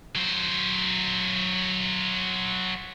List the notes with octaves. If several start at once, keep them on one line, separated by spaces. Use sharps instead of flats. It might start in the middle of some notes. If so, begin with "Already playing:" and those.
F#3 C5